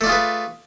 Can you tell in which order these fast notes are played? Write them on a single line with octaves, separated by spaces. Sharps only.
A3 D5 F4 G#4 B4